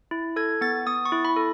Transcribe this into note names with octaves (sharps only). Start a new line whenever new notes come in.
E4
A4 G#6
B3 A6
B3 D#6
C#6
E4
B5
A4